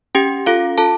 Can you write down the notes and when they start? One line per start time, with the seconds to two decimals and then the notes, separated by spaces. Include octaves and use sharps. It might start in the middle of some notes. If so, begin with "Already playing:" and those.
0.15 C#4 G4 G5
0.46 F4 A4 F5
0.78 F4 A4 A5